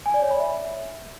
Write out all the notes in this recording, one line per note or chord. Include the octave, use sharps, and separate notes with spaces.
G#5
D5
C#5
B5
E5